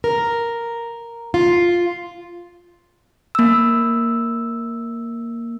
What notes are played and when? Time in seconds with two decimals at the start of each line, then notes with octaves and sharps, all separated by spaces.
0.04 A#4
1.34 F4
3.35 A#3 E6